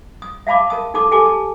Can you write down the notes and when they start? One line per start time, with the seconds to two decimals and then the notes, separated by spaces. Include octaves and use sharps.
0.22 D#6
0.47 E5 F5 A5 B5 D6
0.70 A#4 A5 D#6
0.94 D#4 A4 A5 D6 D#6
1.11 G4 A4 G#5 A5 D6
1.26 A5